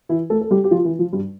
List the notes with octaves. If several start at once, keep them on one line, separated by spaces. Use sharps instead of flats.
E3 E4
A3 A4
A4
G3 G4
G4
F3 F4
E3 E4
F3
G2 G3